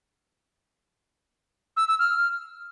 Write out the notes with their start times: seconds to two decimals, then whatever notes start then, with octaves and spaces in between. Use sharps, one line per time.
1.77 E6
1.88 E6
1.99 F6